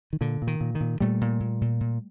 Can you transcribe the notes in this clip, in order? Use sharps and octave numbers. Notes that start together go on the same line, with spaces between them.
D#3
A#2 D3
A#2
D#3
A#2
D#3
A#2
A#2 G3 A3
A#2
A#2
A#2
A#2